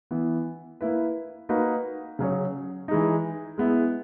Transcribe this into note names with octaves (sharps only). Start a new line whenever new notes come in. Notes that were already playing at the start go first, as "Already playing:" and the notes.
E3 B3 E4
A#3 E4 B4
A#3 D#4 F#4 B4
C#3 F#3 C#4 G#4 C#5
E3 G#3 D#4
G#3 B3 E4